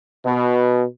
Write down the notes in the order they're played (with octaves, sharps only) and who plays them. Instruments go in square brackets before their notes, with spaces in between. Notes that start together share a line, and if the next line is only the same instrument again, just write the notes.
[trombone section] B2